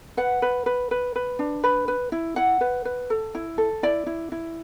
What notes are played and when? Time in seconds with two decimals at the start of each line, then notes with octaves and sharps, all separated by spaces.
0.17 B4 F#5
0.42 B4
0.66 B4
0.91 B4
1.16 B4
1.39 D4
1.63 B4 B5
1.88 B4
2.12 E4
2.36 E4 F#5
2.61 B4
2.85 B4
3.10 A4
3.35 E4
3.58 A4
3.83 E4 D5
4.06 E4
4.32 E4